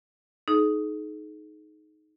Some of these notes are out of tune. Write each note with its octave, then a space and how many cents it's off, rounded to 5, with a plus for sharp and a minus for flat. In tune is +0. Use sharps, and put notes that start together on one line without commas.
D#4 +0 G#4 +40